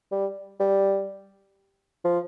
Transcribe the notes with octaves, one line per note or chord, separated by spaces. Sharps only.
G3
G3
F3